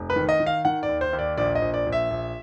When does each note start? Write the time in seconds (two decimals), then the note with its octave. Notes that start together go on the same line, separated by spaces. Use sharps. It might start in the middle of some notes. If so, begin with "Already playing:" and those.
Already playing: F1
0.10 B4
0.16 D#3
0.29 D#5
0.40 D#3
0.46 F5
0.65 D#3 F#5
0.83 D5
0.89 D#2
1.01 C5
1.13 D#2
1.19 D5
1.37 A#1 D5
1.55 D#5
1.62 A#1
1.74 D5
1.86 A#1
1.92 E5
2.11 A#1